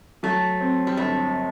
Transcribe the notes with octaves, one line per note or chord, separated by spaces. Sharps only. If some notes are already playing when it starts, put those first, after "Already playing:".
F#3 A3
C4
G3
G1 A3